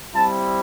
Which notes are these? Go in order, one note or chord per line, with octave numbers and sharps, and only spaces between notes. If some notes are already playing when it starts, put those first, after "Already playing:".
G3 C4 E4 A5